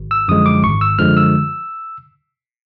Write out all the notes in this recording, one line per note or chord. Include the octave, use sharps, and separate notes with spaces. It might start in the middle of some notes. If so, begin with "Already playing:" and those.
Already playing: G#1
E6
F#2 D3 F3 G#3 D#6
D6
G#1 C#6
E6
F#2 D3 F3 G#3 F6
E6